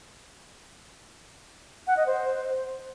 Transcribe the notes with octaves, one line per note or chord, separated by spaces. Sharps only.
F#5
D#5
C5